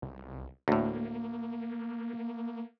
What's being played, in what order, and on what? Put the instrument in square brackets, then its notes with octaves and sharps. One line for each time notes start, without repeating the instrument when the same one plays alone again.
[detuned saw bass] C2
[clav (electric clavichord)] D2 A2 [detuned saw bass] A#3